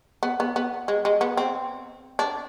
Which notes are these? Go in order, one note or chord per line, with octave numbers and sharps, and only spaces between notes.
B3
B3
B3
G#3
G#3
B3
C4
D4